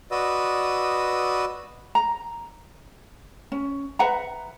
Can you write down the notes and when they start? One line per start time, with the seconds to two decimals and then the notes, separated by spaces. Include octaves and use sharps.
0.11 F#4 B4 D5 D#5 D#6 E6
1.95 A#5
3.52 C#4
3.99 B4 E5 F#5 A#5